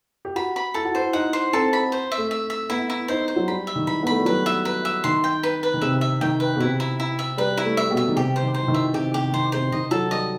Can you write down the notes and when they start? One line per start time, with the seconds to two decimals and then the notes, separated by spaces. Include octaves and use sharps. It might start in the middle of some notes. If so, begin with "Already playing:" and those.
0.25 G4
0.36 F#4 B5
0.56 B5
0.74 E4 A4
0.85 F#4
0.94 E4 C5
1.13 D#4 F#5
1.33 C5
1.53 C4 A4
1.73 B5
1.92 C5
2.12 E5
2.17 A3
2.31 E5
2.50 E5
2.69 B3 E4
2.90 E4
3.08 D#4 C5
3.28 C5
3.36 F#3
3.48 G3 B5
3.67 E5
3.76 D#3
3.87 E3 B5
4.03 B3
4.07 A3 B5
4.18 G3
4.25 F#3 B4
4.46 E5
4.65 B4
4.85 E5
5.04 D#3 C6
5.24 G5
5.43 B4
5.63 B4
5.74 D#3
5.81 C3 E5
6.01 E5
6.21 D#3 G5
6.40 B4
6.56 B2
6.60 C3 E4
6.80 E4
7.00 E4
7.19 E5
7.37 G3 B4
7.57 E4
7.64 A3
7.77 E5
7.91 B2
7.97 E5
8.08 D#3
8.16 C3 G4
8.36 C5
8.43 D#3
8.54 C5
8.63 E3
8.68 D#3
8.74 E5
8.93 C3 G4
9.14 C3 G4
9.32 D#3 C5
9.52 C3 C5
9.72 D#3 D#5
9.91 F#3 A4
10.11 G3 D#5